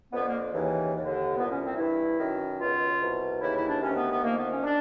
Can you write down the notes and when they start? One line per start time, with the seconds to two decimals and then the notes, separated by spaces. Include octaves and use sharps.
0.13 F2 D3 B3
0.27 A#3
0.54 D#2 C#3 E3
0.95 D#2 D3
1.36 C2 A#2 B3
1.50 C#4
1.64 C4
1.77 G2 E3 E4
2.18 F#2 D#3
2.59 C#2 B2 F4
3.00 C2 B2
3.41 D#2 C#3 E3 E4
3.55 E4
3.68 D4
3.82 D2 C3 D#3 C#4
3.96 B3
4.10 B3
4.23 F2 C3 D#3 A#3
4.37 B3
4.50 C#4
4.64 D4